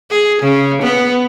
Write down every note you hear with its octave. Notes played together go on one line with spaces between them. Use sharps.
G#4
C#3
B3